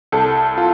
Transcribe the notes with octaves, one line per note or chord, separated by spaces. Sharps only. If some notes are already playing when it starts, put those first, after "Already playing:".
C2 A4
F4